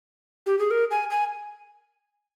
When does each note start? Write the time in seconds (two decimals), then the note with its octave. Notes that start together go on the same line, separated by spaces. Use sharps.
0.46 G4
0.59 G#4
0.71 A#4
0.91 G#5
1.10 G#5